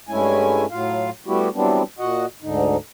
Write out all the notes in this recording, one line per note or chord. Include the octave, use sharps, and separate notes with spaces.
G2 G#3 A3 C#4 E4 G#5
A2 F#3 F4 F5
G3 A3 B3 E4 F#4 G4
E3 F#3 G3 B3 C4 D4
A#2 F#4 D#5 F#5
D2 G#2 D3 D#4